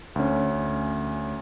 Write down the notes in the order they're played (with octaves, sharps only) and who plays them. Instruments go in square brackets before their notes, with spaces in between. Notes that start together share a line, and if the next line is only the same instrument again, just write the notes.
[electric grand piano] D2 C#4